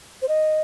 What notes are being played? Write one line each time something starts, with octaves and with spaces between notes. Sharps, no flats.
C5
D#5